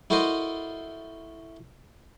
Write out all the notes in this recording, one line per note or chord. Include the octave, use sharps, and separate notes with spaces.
E4 F#4 A4 A#4 C5 D#5